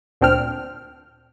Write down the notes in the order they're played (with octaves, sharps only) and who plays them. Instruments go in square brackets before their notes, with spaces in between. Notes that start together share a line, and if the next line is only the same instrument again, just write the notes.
[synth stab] D2 A#2 C4 D4 G5 F6